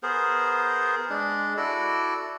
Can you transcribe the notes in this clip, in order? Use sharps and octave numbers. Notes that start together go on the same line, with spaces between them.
B3 G#4 A#4 C5
G#3 D4
E4 F#4 A4 D5